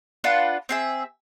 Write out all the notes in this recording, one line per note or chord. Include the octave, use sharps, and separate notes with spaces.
D4 F4 B4 F#5
C4 G#4 E5